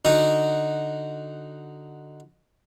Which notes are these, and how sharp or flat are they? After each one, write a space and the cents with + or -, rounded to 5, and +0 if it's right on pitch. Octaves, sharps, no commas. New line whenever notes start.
D3 +5 D#4 +0 F#4 +0